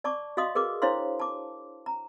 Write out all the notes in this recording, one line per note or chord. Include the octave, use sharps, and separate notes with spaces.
D5 A5 C#6 D6
F#4 D#5 F5 C6 D#6
G#4 A#4 B4 D6
D4 E4 C5 C#5 F5 C6
A5 D6
A#5